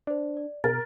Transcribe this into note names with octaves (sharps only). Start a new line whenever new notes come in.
D4 C5 D5
D5
B2 A#4 A6